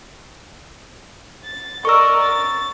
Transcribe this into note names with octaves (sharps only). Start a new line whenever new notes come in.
A6
A#4 D5 D#5 C#6 E6
A6